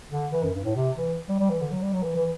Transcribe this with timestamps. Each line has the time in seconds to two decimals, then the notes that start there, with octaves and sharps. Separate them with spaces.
0.11 D3
0.32 E3
0.43 F#2
0.54 G2
0.64 A2
0.76 C3
0.97 E3
1.29 G3
1.40 G3
1.50 E3
1.61 D3
1.71 F#3
1.82 G3
1.93 F#3
2.03 E3
2.16 E3